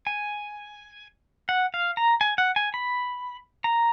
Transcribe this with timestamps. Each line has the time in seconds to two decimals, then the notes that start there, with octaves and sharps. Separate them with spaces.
0.07 G#5
1.49 F#5
1.74 F5
1.97 A#5
2.21 G#5
2.38 F#5
2.56 G#5
2.74 B5
3.64 A#5